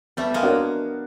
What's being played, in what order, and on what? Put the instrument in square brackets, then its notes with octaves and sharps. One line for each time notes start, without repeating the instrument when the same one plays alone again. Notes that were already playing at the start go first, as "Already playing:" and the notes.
[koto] G3 A3 [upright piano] B3
[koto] G#3 A#3
[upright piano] D4 F#4 A#4 C#5